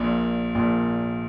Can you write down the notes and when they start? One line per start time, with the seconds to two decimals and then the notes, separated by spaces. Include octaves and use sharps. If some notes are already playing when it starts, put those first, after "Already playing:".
Already playing: A#1 A#2
0.55 A#1 A#2